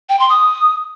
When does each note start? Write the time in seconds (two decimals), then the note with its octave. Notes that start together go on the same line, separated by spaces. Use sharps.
0.09 G5
0.19 C6
0.30 D#6